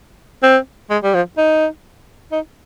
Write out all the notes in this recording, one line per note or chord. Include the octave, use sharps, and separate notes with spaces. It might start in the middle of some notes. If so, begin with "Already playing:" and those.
C4
G#3
G3
F3
D#4
D#4